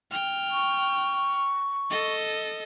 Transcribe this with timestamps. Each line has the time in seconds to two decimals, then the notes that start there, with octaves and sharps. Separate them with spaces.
0.11 G5 F6
0.51 C#6
1.90 A4 D#5